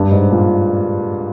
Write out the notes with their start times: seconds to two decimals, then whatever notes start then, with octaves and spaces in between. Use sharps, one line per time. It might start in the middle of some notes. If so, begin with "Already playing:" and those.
Already playing: G2
0.11 G#2
0.31 A#2